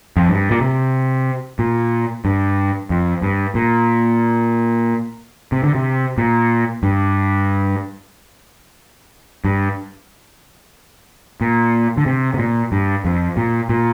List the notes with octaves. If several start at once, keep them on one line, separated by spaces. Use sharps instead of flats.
F2
G2
A#2
C3
A#2
G2
F2
G2
A#2
C3
D3
C3
A#2
G2
G2
A#2
D3
C3
C3
A#2
G2
F2
A#2
A#2